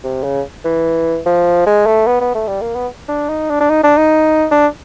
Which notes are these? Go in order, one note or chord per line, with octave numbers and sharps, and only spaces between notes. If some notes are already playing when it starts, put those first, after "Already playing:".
C3
C#3
E3
F3
G#3
A3
B3
B3
A3
G3
A#3
B3
D4
D#4
D4
D4
D#4
D4
D#4
D4